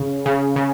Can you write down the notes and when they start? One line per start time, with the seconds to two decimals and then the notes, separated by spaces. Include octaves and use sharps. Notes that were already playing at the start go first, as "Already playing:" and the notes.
Already playing: C#3
0.26 C#3
0.56 C#3